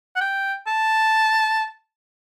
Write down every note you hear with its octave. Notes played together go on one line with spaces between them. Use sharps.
F#5
G5
A5